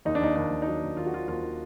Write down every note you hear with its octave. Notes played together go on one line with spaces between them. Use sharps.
D#2 D#4
D4
D#2 D#4
D#2 D4
D#2
D#4
F#3 D4
D#2
D#3 F4
F#4
D#2 F4
D#2 F4
D#3